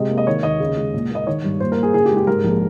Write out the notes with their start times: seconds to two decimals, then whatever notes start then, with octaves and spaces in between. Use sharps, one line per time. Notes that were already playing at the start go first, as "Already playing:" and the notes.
Already playing: C3 G#3 D#5
0.10 A#3
0.18 D#5
0.27 D#3 C#5
0.43 D#2 D#5
0.60 C#3
0.77 G#3
0.94 A#2
1.10 A#3 D#5
1.27 D#3 C#5
1.44 G2
1.60 A#2 C5
1.72 A#4
1.77 A#3
1.83 G#4
1.94 C#3 G#4
2.05 G4
2.11 G#3
2.16 G4
2.27 G#2 A#4
2.44 A#1